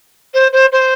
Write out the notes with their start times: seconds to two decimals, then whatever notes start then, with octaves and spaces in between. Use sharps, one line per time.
0.34 C5
0.52 C5
0.72 C5